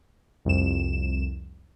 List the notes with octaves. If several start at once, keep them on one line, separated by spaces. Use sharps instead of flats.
C2 F2 E7